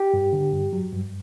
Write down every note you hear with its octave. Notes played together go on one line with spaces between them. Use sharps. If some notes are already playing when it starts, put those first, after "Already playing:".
Already playing: G4
G2
D3
G2
F#3
G2